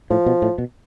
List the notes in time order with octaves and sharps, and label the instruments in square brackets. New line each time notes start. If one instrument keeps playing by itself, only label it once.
[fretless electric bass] A2 [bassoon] F3
[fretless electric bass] B2
A2
B2